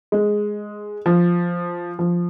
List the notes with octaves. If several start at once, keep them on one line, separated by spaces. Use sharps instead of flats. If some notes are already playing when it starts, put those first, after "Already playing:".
G#3
F3
F3